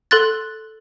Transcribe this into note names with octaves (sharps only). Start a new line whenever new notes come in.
A4 C6 F#6 A6